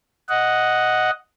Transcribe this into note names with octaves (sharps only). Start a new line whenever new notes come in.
D#5 F#5